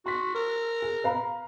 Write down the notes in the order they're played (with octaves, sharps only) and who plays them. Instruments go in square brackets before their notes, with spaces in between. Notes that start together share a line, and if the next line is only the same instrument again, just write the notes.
[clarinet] F#4 [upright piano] C6 B6
[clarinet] A#4
[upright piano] G#4
B4 F5 A#5